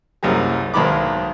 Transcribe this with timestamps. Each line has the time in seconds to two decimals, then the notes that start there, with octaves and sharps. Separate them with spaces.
0.23 C2 F#2 G3 A#3 G#4
0.74 B1 G#2 D#3 A#4 B5 D6